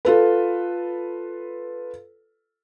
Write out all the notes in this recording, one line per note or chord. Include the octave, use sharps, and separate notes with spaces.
F4 A4 B4